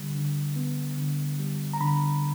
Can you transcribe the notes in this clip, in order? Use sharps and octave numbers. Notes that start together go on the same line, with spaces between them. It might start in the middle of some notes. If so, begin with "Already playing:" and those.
Already playing: D3 G3
D3
B3
D3
G3
A#5
D3 B5